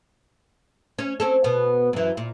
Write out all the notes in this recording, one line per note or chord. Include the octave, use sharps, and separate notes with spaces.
C#4
C4 C#4 A4
B2 B3
F#2 E3
A#2